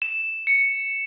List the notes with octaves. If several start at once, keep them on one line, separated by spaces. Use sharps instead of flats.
E7
C#7